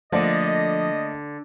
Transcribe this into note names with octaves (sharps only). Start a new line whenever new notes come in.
D3 F3 A3 A#3 D5 D#5